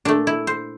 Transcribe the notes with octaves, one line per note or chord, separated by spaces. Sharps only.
A#2 A3 D4
E4
C5